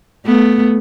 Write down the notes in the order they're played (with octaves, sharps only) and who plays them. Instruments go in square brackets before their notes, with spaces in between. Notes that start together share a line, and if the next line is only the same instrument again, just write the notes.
[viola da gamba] A3 B3